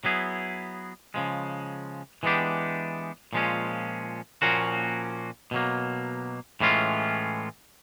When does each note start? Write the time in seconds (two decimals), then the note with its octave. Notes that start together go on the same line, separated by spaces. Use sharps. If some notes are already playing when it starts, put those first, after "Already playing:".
0.05 F#3 B3 E4 G#4
1.14 C#3 F3 G#3
2.23 E3 G#3 B3 D4 G4
3.33 A#2 F3 G#3 C#4
4.42 A#2 F3 A#3 C#4 F#4
5.51 B2 F#3 A#3
6.61 A2 E3 G#3 C#4 F4